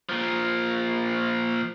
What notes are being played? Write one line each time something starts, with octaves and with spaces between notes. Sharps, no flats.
A#2 F3